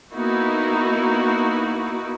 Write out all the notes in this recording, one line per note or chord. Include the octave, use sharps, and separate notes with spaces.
A#3 B3 D#4 E4 F#4